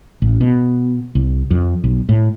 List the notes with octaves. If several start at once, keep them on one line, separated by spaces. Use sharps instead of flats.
A1
B2
C2
F2
B1
A2